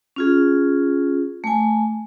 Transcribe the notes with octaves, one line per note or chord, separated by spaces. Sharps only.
C#4 F4 G#4
A3 G#5